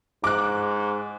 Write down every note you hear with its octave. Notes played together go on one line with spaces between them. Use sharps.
G#2 D6 F#6